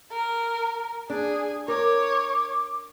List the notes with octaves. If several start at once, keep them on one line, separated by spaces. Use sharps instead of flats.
A#4
D4 G#4
A#4 C#5 D6